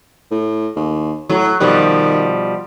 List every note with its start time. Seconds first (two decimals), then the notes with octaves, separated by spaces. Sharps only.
0.31 A2
0.77 D#2
1.29 A2 F#3
1.60 B2 D#3 F3 G3